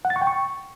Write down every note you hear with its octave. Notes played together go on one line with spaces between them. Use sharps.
F#5
A6
C#6
G5
C#6